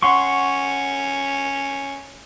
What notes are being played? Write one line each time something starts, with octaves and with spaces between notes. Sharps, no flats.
C#4 F#5 C6 C#6